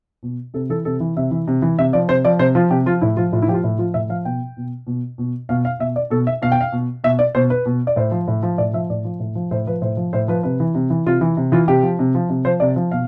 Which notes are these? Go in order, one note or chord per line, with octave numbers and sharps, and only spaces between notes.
B2
C3 A4
E3 A4
C3 A4
E3
C3 E5
E3
C3
E3
C3 E5
F3 D5
C3 C5
F3 D5
C3 C5
F3 F4
C3 G4
F3 F4
A2 E4
F3 F4
A2 F4
E4
F3 G4
F4
A2
F3 F4
A2 E5
F3 F5
B2 G5
B2
B2
B2
B2 F5
F5
B2 E5
D5
B2 A4
E5
B2 F5
G5
F5
B2
B2 E5
D5
B2 C5
B4
B2
D5
A2 C5
F3
A2
F3
A2 D5
F3 E5
A2 D5
F3
A2
F3
A2 C5
F3 B4
A2 C5
F3
A2 C5
F3 B4
C3 B4
E3
C3
E3
C3 F4
E3
C3
E3 F4
C3 G4
F3
C3
F3
C3
F3 C5
C3 D5
F3
B2 F5